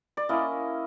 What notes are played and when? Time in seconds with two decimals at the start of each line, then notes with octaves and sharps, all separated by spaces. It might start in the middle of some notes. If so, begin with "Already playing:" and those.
0.17 D5
0.29 A#3 C#4 E4 D#5